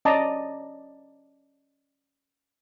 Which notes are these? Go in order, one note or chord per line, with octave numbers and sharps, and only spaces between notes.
C#4 D5 D#5 A5 A#5